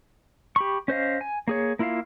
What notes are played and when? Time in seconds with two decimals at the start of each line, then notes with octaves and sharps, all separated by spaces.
0.56 G4 B5 C#6
0.88 C#4 C5 D#5 F5
1.21 G#5
1.48 A#3 G#4 C#5
1.79 A#3 E4 F4 E5 F5